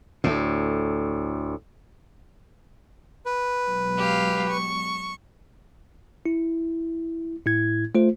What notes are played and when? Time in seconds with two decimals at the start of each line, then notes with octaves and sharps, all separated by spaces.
0.24 D2 A2
3.26 B4
3.64 B2 F#3 G#3
3.97 G4 F5
4.49 C#6
6.26 E4
7.46 A2 E4 G#6
7.95 A3 F4 C5